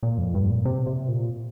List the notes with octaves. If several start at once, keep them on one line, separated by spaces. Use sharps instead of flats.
A#2
F2
G2
A#2
C3
C3
A#2